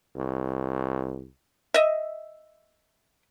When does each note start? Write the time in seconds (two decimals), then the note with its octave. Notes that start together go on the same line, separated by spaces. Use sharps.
0.16 C2
1.74 D#5 E5